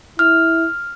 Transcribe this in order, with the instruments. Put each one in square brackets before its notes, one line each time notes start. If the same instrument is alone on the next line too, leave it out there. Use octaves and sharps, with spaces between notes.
[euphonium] E4 [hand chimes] F6